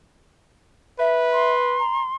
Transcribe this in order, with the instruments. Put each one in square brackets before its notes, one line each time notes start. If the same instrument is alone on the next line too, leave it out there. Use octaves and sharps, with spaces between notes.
[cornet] B4 [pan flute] E5
[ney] C6
[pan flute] A#5